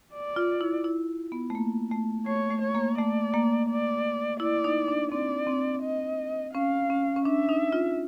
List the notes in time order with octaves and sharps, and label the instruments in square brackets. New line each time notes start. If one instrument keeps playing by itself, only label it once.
[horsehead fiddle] D5
[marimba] F4
E4
E4
B3
A3
A#3
A3
[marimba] A3 [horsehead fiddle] C#5
[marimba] A3
[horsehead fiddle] C#5
[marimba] A#3
[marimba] A3 [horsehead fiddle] D5
[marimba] A#3
[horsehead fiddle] D5
[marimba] E4 [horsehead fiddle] D5
[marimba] D#4
D4
[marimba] C4 [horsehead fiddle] D5
[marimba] C4
[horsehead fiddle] D#5
[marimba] C#4 [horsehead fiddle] F5
[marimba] C#4
C#4
[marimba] D4 [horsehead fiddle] E5
[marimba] D#4
F4